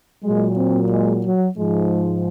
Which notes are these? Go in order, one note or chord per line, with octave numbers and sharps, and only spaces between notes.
A#2 F#3 G#3
C4
G#3
F#3
G#2 F3 G#3